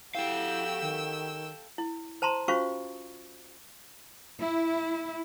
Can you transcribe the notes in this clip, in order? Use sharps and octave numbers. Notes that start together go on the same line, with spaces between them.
E4 F#4 G4 A4 F5 G5 E6
D#3
E4
C5 A5 A#5 C6
C#4 F4 F#4 C5 F5 C#6
E4